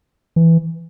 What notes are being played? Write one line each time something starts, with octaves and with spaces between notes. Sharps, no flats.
E3